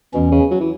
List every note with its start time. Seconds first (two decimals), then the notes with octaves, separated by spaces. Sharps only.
0.14 E2 B2 E3 C#4
0.32 C#3
0.51 F#3
0.60 E3